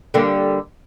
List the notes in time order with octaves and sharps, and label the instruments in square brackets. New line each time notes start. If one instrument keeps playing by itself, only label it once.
[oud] D3 G3 A#3